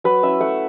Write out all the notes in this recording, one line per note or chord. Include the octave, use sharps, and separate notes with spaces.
F#3 B4
C#4 E4 E5
A3 F#5